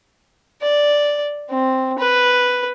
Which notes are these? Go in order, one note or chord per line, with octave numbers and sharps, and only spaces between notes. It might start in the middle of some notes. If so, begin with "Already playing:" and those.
D5
C4
B4